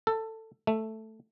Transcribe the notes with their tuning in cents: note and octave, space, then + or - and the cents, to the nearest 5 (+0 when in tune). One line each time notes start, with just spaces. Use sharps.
A4 +15
A3 +0